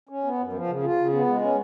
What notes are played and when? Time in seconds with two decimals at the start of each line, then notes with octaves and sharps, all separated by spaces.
0.09 C#4
0.24 B3
0.39 F#2
0.53 F3
0.67 C#3
0.83 F4
0.97 C#3
1.12 B3
1.27 G#3
1.42 C#4